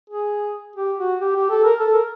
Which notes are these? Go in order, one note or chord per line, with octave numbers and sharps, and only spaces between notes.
G#4
G4
F#4
G4
G4
A4
A#4
A4
A#4